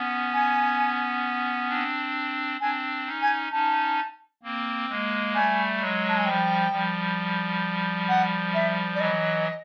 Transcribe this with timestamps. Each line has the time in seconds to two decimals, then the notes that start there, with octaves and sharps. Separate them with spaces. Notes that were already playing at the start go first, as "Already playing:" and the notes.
Already playing: B3 C#4
0.33 G#5
1.69 C4 D4
2.61 C4 D4 G#5
3.06 C#4 D#4
3.22 G#5
3.52 C#4 D#4 A5
4.43 A#3 C4
4.89 G#3 A#3
5.34 G3 A3 G#5
5.81 F#3 G#3
6.09 A5
6.17 G#5
6.26 F3 G3 G5
6.71 F3 G3
8.09 F#5
8.54 E5
8.95 D5
8.99 E3 F#3 D#5